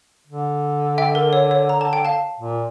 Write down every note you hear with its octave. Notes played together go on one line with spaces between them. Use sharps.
D3
E5 G5
A#4
C#5
C#5
A#5
A5
G5
F5 A5
A#2